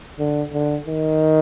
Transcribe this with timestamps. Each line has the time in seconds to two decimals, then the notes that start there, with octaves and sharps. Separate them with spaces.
0.19 D3
0.53 D3
0.87 D#3